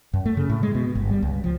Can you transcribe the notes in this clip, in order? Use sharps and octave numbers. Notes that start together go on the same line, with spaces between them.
F#2
A3
C#3
A2
G#3
B2
G1
G3
C#2
F3